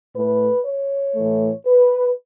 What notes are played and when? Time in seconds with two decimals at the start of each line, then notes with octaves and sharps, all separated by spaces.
0.14 A2 A3 B4
0.64 C#5
1.15 A2 E3 A3
1.65 B4